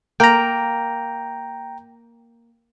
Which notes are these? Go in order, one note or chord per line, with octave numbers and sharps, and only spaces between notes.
A#3 G5 A#5